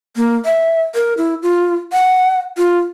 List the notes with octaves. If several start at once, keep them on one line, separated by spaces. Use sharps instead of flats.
A#3
E5
A#4
E4
F4
F#5
F4